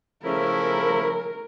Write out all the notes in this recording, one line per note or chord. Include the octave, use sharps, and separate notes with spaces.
C#3 F3 A3 C#4 E4 A#4